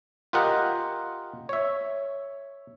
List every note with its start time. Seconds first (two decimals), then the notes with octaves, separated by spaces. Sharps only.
0.33 F4 G4 A#4 D#5 F#5
1.49 C#5 E5